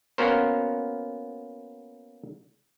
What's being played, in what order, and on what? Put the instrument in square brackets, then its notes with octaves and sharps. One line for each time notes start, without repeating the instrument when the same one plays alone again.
[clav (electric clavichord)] A#3 B3 C#4 F#4 A#4 C5